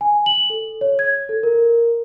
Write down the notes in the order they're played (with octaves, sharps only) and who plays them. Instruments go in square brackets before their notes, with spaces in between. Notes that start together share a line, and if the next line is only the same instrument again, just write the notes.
[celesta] G#5
F#7
A4
C#5
G#6
A4
A#4